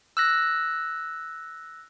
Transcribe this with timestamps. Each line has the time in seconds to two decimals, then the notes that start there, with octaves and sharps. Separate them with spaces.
0.17 E6 F#6 A#6